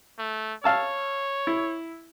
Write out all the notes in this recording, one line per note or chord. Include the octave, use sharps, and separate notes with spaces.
A3
C#5 F5 A5 E6
E4